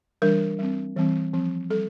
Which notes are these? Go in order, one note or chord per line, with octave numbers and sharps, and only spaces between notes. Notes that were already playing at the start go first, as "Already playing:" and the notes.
E3 G3 D4 A#4
G3 C4
E3 G3 C4
F3 C4
G3 A4